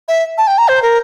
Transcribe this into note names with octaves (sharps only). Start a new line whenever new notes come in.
E5
A5
G5
A#5
C5
A#4